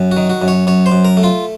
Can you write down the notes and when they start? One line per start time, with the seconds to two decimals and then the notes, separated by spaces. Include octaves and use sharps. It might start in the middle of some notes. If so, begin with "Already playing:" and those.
Already playing: F#2
0.11 F#4
0.17 D#3
0.30 F#4
0.42 F#2
0.48 C#5
0.67 F#2 C#5
0.86 C5
0.92 F#2
1.05 A#4
1.17 A3
1.23 F4